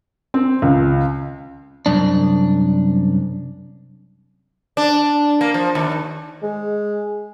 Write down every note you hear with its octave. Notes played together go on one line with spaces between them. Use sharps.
C4
C#2
C2 F#2 D4
D4
A#3
F3
D#2
G#3